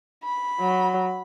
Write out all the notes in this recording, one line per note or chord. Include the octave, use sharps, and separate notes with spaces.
B5
F#3